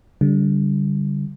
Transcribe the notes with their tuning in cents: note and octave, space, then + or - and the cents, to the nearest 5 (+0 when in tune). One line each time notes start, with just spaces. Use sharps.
D3 -30 G3 -5